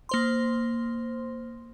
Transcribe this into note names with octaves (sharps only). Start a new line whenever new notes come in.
A#3 C5 C6